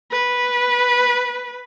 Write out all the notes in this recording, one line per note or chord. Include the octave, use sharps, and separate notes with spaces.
B4